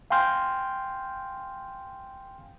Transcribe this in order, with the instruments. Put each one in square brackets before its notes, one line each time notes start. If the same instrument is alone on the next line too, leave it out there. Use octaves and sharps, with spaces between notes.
[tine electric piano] F5 G5 G#5 C6 F6 G6